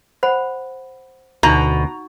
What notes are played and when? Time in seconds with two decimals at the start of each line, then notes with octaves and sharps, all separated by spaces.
0.23 C5 F#5 B5
1.43 D2 B2 D#4 A#5